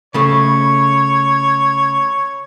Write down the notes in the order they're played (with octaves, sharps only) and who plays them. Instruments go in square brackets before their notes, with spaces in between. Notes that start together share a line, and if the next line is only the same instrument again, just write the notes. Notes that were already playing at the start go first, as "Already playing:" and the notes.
[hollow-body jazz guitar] C#3 A3 [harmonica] C#5 [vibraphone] B5 C#6